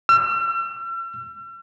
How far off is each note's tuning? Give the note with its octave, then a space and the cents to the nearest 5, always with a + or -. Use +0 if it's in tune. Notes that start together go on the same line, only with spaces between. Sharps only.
E6 +45